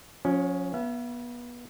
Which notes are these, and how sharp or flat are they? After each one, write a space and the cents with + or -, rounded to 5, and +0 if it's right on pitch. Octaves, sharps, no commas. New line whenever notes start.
F3 +40 C#4 +0
B3 -30 E5 +35